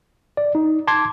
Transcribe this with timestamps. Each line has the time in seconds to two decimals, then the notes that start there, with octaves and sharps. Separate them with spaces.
0.37 D5
0.55 D#4
0.87 A5 C6 D6 G#6